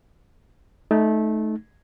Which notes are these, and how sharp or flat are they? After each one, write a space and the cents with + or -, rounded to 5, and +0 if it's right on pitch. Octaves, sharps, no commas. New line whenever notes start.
A3 -20 D#4 +0